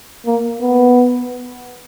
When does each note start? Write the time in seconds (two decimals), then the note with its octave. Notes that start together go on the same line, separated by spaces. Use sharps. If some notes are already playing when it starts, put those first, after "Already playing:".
0.26 A#3
0.62 B3